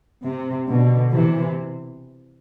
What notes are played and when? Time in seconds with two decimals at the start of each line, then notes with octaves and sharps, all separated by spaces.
0.23 C3
0.68 B2 D3
1.12 C3 E3